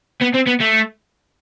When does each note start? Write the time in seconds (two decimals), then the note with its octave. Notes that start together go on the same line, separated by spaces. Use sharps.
0.22 B3
0.35 C4
0.47 B3
0.61 A3